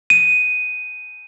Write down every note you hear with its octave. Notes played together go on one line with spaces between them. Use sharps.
D#7